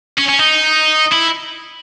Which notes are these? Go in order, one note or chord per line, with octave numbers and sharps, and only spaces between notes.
C#4
C#4
D#4
E4